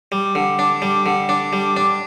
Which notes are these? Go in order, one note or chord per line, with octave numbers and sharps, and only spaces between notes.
G3
D3
D4
G3
D3
D4
G3
D4